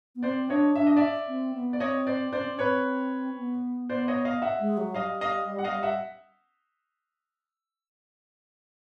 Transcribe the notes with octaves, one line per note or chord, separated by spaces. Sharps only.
B3
C4 C5 D5
D4 C#5 D#5
D4 E5
D#5
D5 E5
C4
B3
D5
C4 C#5 D#5
C5 D5
C#4 C5 D5
C4
C#4
C4 B4 C#5
B3
B3 C5 D5
C#5 D#5
D#5 F5
E5 F#5
G#3
F#3
G3 D#5 F5
D#5 F5
F#5
D#5 F5
E5 F#5